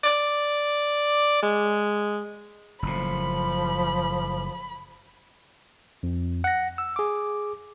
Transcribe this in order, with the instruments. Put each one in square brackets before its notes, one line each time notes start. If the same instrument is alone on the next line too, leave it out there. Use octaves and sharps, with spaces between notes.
[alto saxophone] D5
G#3
[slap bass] F#1 A2 [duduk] F3 [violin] B5
[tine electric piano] F2
F#5 A#6
E6
G#4 D6